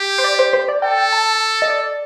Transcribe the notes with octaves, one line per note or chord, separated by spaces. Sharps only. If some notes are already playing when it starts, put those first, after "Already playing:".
Already playing: G4
C5
D5
C5
C5
D5
A4 G5
A5
D#5
D5